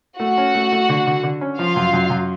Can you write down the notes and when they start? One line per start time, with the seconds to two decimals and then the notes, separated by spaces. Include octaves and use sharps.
0.19 A3 F#4 F#5
0.38 C#4
0.55 A3
0.72 A3
0.89 D3
1.07 D3
1.23 D3
1.41 C#4
1.59 F3 F4 F5
1.76 F#2
1.93 F#2
2.10 F#2